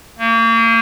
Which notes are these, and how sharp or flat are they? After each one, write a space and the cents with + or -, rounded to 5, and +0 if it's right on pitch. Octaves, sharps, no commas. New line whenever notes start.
A#3 -35